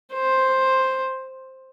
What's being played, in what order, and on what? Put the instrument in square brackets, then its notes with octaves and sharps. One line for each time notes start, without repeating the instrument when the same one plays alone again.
[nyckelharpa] C5